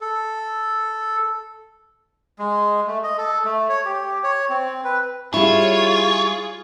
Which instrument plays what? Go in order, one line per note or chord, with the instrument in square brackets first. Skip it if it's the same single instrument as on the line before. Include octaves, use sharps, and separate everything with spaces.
[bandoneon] A4
[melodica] G#3
A3
D#5
A4
A3
C#5
G4
C#5
C4
B4
[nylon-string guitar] G3 E4 [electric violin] F4 G#4 [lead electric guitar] C#5